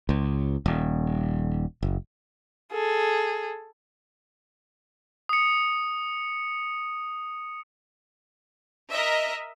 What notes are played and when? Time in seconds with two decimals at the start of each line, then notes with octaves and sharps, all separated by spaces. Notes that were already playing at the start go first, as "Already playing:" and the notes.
0.09 C#2
0.66 D#1
1.83 F#1
2.72 G#4 A4
5.29 D#6 C#7
8.91 A#4 D#5 E5